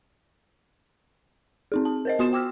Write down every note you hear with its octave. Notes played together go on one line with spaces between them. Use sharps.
C4 D#4 G#4
A5
A#4 C5 D#5
B3 F#4 C6 D#6 E7
G5 D6 E6 F6